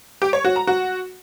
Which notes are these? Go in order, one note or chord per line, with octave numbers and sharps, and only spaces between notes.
G4
C#5
F#4
A#5
F#4